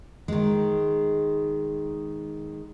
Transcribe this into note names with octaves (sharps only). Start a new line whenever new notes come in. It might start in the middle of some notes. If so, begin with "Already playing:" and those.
D#3 G#3